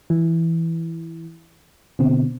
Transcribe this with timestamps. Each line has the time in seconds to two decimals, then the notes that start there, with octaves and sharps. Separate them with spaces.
0.10 E3
1.99 B2 D3 C4